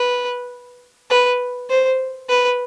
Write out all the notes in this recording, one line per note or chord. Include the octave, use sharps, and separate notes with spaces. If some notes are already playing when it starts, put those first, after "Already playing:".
Already playing: B4
B4
C5
B4